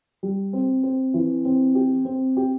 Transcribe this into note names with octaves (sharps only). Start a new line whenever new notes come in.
G3
C4
C4
E3
C4
G4
C4
G4